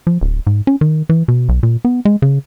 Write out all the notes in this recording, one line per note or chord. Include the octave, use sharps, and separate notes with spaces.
F3
D1
G#2
C#4
D#3
E3
B2
B1
A#2
B3
G#3
C#3